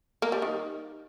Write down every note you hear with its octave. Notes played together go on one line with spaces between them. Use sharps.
A#3
G3
D#3